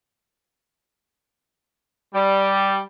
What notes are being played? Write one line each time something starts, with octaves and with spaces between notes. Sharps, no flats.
G3